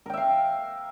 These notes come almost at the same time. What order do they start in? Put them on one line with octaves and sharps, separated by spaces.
A#4 G5 E5 F5